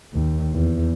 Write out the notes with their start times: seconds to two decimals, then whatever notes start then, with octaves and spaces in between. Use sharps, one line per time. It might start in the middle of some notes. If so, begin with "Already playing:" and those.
0.13 D#2
0.52 E2